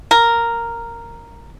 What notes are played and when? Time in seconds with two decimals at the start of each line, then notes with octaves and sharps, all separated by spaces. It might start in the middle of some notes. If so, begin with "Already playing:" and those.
0.11 A#4